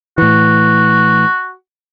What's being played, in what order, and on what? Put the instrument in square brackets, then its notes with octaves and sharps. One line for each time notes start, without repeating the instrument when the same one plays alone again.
[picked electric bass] A2 E3 [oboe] F#4